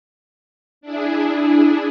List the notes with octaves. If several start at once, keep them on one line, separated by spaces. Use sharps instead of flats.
D4 E4 G#4